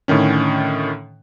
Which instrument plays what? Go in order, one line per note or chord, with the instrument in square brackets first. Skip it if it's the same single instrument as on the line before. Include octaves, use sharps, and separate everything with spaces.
[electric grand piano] A2 D3 D#3 C#4